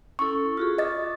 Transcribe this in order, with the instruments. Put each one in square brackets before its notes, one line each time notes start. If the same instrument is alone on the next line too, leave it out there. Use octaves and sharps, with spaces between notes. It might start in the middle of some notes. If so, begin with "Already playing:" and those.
[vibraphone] C#4 E4 A4 [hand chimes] C#6
[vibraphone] F4 F#4 G#4
[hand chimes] D#5 A6 [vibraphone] D6